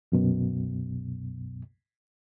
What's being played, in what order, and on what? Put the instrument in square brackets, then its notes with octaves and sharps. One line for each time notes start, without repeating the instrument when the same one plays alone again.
[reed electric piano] C2 F#2 B2